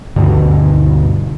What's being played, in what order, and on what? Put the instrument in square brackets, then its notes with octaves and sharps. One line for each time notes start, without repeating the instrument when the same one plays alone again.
[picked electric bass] D2 G2 B2 D3